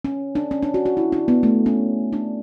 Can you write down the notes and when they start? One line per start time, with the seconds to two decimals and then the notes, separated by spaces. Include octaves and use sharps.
0.05 C#4
0.35 D4
0.51 C#4
0.63 D4
0.74 F#4
0.86 F#4
0.97 E4
1.12 D4
1.28 B3
1.43 A3
1.66 C#4
2.13 D4